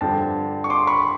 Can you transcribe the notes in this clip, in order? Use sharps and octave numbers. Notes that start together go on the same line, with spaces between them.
G2 D3 F3 G5 A5
C#6
C6 D6
B5 C#6